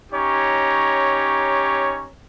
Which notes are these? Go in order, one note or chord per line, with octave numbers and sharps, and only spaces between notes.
C#4 D#4 G4 C#5 A#5